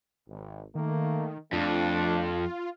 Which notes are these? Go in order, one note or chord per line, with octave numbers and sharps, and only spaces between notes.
G#1
D#3 A3 A#3
F2 A3 D4 F4